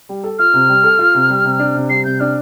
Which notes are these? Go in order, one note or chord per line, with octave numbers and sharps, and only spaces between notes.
G3
A4
F4 F6
C3
G3
A4
F4
C3
G3
C3
D4
C3
G3 C7
C3 G6
D4 F6